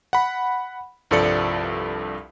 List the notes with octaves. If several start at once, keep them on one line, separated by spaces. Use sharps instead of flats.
F#5 B5
C2 G2 F3 A4 D5 C#7